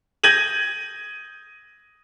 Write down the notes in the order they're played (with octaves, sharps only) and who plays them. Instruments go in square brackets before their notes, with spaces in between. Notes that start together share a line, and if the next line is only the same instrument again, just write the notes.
[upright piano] G6 G#6 A#6 D#7 F#7